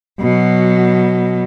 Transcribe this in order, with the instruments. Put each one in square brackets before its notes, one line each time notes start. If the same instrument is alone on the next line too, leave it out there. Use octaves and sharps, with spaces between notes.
[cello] B2 F#3